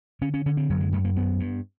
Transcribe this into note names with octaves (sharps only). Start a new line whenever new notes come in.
D3 C#4
C#4
D3 C#4
C4
F#2 F#3
G#3
F#2 A3
A#3
G2 B3
G2